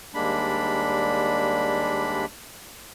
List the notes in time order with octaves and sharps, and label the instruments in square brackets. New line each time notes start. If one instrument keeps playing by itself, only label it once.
[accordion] D#2 G3 G#3 A#3 D4 B5